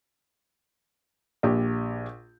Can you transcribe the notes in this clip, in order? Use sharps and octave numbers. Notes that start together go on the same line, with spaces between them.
A#1 G4